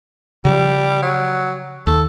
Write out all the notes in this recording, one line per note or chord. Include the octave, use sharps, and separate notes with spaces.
C#3 F3 G3
F#3
D#2 A4